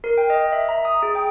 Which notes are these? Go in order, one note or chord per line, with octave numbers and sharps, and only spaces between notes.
A#4
G5
D#5
E5
A#5
D#6
G#4
G5